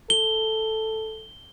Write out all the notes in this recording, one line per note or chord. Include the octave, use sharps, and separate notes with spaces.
A4 G7